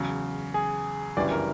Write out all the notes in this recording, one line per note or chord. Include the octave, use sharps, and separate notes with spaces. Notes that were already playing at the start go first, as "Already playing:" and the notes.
Already playing: E2 C#3 F#3
G#4
G1 F#2 C#3 E3 G3 D5
A#4